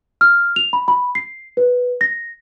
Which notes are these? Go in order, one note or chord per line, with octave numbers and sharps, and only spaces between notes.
F6
F7
B5
B5
C7
B4
A#6